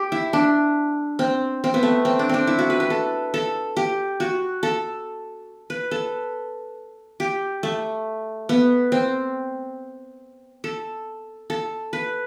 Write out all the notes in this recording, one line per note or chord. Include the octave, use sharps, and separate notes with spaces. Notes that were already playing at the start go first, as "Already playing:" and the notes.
Already playing: G4
E4
D4
C4
C4
B3
A3
C4
D4
C4 D4
E4
F#4
B4
B4
A4
A4
G4
F#4
A4
B4
A4
G4
A3
B3
C4
A4
A4
B4